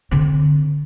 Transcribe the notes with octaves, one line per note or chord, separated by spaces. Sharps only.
D3 C4